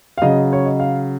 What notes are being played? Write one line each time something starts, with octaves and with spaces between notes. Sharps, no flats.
F5
C#3 F#3 D#5
C#5
D#5
F5